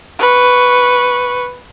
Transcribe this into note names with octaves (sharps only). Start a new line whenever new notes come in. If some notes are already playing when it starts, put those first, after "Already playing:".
B4 C#6